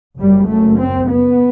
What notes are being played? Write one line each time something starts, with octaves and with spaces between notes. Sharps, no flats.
F#1 F#2 G3
A3
C4
B3